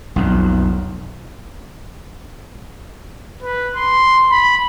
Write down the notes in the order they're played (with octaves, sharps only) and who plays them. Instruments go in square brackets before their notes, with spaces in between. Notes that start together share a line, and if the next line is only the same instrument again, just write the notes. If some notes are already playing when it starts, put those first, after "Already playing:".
[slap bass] B1 F2
[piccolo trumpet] B4
C6
B5